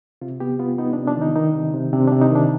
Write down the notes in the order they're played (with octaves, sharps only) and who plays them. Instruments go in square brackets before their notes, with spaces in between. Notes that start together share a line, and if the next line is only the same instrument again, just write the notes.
[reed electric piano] C3 F4
B3 G4
B3 F4
B3 D#4
D4
C3
D4
D#3 D#4
D#3 D#4
C3
C3
C3 D4
D4
C3
D#4
D#3 D4